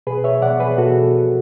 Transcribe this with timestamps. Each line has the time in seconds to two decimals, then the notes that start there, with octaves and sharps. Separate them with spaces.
0.07 B2 G#4 B4
0.24 C#5 E5
0.42 B2 D5 F#5
0.60 G#4 B4
0.78 B2 F#4 A4